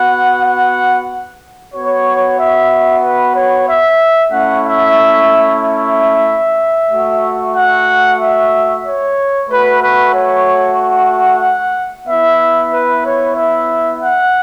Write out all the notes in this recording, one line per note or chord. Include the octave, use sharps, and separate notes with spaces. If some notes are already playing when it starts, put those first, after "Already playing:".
Already playing: B3 F#4 F#5
F#5
B3 F#4 C#5
E5
B4
C#5
E5
A3 C#4 E4 F#5
E5
E5
A3 F#4
F#5
E5
C#5
A3 F#4 B4
B4
C#5
F#5
B3 E4 E5
B4
C#5
E5
F#5